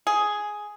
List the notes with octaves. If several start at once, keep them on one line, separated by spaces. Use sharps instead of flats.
G#4